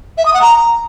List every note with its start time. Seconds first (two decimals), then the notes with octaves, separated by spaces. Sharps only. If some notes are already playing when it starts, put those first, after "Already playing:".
0.17 E5
0.25 D#6
0.33 F#5
0.41 A#5